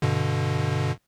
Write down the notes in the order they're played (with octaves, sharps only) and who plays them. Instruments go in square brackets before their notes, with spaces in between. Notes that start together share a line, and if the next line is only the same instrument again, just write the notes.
[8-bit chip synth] G2 B2 D3